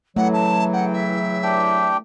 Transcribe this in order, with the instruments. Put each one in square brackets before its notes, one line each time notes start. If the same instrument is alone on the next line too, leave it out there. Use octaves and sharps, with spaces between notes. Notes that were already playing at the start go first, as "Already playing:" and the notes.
[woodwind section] C#3 E3 F#3 [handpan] A3 [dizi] F#5
[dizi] A5
[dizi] F#5 [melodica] G5
[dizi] E5
[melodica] D4 G4 G5